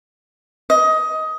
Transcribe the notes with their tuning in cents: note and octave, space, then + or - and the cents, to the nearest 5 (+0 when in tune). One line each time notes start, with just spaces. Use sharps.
D#5 +20